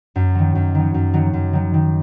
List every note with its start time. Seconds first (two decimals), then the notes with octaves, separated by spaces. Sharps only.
0.16 F#2
0.35 D#3 F#3
0.55 F#2
0.75 D#3 F#3
0.94 F#2
1.14 D#3 F#3
1.33 F#2
1.53 D#3 F#3
1.74 D#3